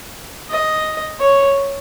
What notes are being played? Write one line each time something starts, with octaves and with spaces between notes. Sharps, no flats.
D#5
C#5